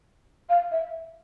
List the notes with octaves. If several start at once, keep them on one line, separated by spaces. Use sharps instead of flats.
F5
E5